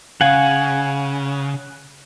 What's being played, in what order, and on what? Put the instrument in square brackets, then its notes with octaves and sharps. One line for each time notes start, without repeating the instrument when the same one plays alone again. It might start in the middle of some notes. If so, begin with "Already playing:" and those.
[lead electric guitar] C#3 [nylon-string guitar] F5 [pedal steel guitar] F#5 G#5